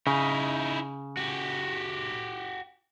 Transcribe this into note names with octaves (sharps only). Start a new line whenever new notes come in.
C#3 D#4 E4
F#4 G4